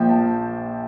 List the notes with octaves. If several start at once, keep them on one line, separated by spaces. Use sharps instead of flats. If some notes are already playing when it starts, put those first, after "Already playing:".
Already playing: A#1 A#2 F3 G5
A5